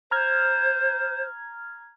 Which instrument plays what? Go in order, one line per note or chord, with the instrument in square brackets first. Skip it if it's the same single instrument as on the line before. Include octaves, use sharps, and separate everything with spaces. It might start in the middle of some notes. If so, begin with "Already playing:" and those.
[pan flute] C5 [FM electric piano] A#5 F6 G#6